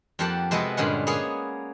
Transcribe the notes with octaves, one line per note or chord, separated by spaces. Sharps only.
F2 F3 A#3 G4 F#5 A5
C3 G#3 B3 F#4 A4 B4
G2 A#2 D3 G#3 C#4 F#5
A#3 B3 G#4 C#5